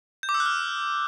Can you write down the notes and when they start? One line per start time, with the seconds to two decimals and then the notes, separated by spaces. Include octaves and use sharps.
0.23 G6
0.29 D6
0.34 E6
0.40 F#6
0.46 F6